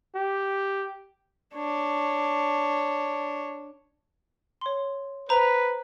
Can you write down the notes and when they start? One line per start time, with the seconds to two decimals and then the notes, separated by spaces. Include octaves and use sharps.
0.15 G4
1.54 D4 C#5
4.61 C#5 C6
5.29 B4 C5 A#5 F7